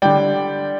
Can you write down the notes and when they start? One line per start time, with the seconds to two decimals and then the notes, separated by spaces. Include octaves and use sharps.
0.02 D3 G3 D5 G5